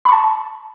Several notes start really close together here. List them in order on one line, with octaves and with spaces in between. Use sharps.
B5 C#6 A5